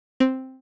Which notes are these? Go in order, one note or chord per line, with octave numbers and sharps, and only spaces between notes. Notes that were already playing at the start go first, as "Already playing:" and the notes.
C4